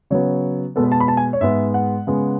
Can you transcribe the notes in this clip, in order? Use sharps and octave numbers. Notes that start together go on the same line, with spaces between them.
C#3 F#3 B3 C#5
B2 G#3 B3 A4
B4
A5
B5
A5
G#5
C#5
G#2 G#3 B3 E5
F#5
C#3 G#3 B3